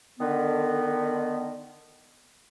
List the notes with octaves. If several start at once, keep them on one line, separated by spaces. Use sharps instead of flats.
D3 D#3 B3